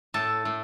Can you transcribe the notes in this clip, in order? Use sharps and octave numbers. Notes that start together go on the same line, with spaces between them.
A2 A4
A2